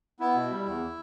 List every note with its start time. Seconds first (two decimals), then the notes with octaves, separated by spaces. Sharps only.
0.20 B3 E4
0.35 B2
0.51 G3
0.66 E2